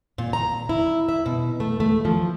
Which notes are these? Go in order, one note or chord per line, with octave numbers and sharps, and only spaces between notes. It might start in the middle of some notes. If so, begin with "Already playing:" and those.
A#2
A#5
E4
E5
B2
A3
A3
F3